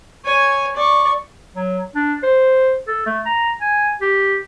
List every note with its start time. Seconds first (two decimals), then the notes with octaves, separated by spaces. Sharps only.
0.25 C#5 G#5
0.76 D5 C#6
1.55 F#3
1.95 D4
2.23 C5
2.87 A4
3.06 A3
3.26 A#5
3.61 G#5
4.01 G4